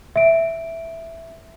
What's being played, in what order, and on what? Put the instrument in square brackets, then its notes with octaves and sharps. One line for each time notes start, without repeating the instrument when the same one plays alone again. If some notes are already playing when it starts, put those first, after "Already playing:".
[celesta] E5 D7